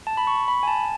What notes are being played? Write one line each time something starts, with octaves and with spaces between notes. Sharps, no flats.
A5
B5
C#6
B5
G#5
A5